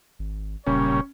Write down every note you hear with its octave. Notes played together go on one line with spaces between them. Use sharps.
G#1
E1 A#2 C#3 G3 C#4 C#5